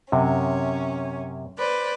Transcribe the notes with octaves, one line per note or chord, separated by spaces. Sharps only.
F#2 C3 C#4
B4 C5 D5